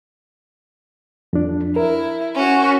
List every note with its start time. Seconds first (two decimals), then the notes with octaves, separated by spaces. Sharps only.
1.33 F2 D4
1.76 E4 A#4
2.36 C#4 F#4